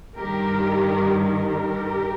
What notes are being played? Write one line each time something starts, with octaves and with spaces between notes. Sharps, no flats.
G2 D#3 G4 A#4
G4 A#4